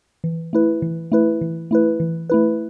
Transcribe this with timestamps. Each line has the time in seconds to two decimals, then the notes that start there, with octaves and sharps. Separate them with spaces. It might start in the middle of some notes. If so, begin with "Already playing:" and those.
0.24 E3
0.53 A3 E4 B4
0.82 E3
1.12 A3 E4 B4
1.41 E3
1.71 A3 E4 B4
2.00 E3
2.30 A3 E4 B4